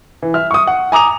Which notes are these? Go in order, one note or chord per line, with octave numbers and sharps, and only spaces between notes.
E3
E5 F6
C#6 D#6
F#5
G#5 A#5 D6 D#6 F7